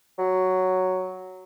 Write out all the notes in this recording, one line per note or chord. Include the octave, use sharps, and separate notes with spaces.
F#3